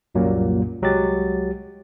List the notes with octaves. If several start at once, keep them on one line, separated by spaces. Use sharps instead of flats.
C2 F#2 A#2 F#3 G3 A#3
C2 F#3 G#3 G4 A6